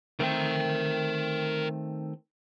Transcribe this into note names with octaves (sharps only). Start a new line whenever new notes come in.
D#3 A3 C4 A#4 G5